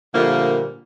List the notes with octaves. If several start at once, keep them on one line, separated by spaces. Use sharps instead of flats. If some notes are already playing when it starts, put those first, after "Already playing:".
A#2 D3 F3 G3 A3 A#3